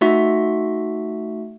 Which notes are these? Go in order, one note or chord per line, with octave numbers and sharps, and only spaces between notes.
A3 D#4 F#4 E5 C#6 B6